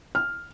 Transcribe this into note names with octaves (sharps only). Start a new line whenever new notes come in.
F6